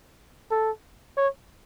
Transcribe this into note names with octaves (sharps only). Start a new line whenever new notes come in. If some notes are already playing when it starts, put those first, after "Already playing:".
A4
C#5